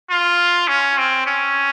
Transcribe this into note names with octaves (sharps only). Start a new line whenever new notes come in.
F4
C#4
C4
C#4